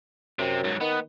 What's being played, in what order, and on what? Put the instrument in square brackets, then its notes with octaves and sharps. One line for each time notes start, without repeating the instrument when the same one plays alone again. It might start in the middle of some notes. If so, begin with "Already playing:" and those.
[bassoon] F#2 [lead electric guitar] C3 C4
[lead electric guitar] G#2 F#3
[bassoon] D#3 [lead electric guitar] B3